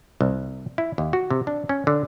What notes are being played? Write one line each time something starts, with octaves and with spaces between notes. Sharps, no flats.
C2
E4
D#2
F#4
C3
D4
C#4
D3